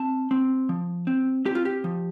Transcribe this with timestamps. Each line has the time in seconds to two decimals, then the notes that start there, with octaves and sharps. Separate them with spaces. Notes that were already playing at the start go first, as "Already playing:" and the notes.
Already playing: C4 A5
0.31 C4
0.69 F3
1.07 C4
1.45 C4 G4
1.55 F4
1.65 G4
1.84 F3